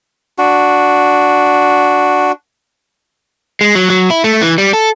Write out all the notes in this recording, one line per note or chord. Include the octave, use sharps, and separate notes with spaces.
D4 F#4
G#3
F#3
F#3
E4
A3
E3
G3
A4